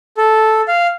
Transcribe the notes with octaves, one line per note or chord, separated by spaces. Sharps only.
A4
F5